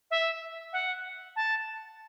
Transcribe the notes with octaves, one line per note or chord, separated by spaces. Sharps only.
E5
F#5
A5